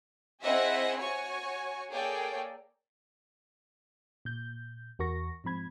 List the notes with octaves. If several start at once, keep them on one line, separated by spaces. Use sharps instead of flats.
C4 E4 G#4 D#5 E5 F#5
F#4 C#5 G#5 C#6
A#3 G#4 A4 C#5 D5 G5
A#2 G6
E2 F#4 A#4 C#6 A#6
G#2 F3 C4 B5 G#6